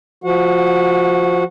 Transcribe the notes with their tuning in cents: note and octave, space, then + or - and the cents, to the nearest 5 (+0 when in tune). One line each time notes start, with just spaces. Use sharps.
F3 +0 F#4 -5 F#5 -30